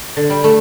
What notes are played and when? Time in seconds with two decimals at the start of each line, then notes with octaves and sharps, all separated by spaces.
0.16 D3
0.30 G3
0.44 A3